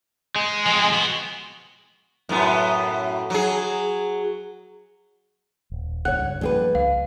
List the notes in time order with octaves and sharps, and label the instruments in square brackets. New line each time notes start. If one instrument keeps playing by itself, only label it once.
[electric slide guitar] G#3
[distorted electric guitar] F3 C4
B3 F#4
[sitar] F#2 A2 B3
F#3 G#4
[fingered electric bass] D#1
[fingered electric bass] C#2 G2 [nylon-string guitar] C#5 F#5 [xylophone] F#6
[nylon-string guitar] G2 G#4 B4 [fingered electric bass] F3 A3 A#3
[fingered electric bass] C#2 [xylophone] F5